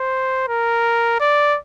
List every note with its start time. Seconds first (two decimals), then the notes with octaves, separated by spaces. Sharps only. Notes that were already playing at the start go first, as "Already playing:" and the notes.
Already playing: C5
0.48 A#4
1.20 D5